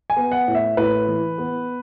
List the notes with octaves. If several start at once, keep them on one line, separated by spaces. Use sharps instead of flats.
G#5
B3
F#5
A2
E5
A2 B4
E3
B3